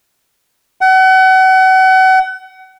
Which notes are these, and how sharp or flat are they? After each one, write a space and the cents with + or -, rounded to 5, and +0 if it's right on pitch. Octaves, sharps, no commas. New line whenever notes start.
F#5 +35